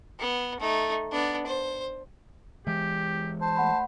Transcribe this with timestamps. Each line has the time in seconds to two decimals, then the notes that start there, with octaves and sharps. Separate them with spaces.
0.19 B3
0.60 A3 D#4
1.11 B3 D4
1.46 C5
2.67 E3 G#3 G4
3.41 C5 A5
3.56 A3 F#5 B5